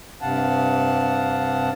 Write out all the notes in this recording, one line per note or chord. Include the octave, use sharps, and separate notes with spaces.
G2 C3 F5 F#5 A5